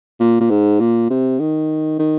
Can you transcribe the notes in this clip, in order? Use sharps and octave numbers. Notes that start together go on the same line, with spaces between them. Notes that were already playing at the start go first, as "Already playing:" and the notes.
A#2
A#2
G#2
A#2
C3
D#3
D#3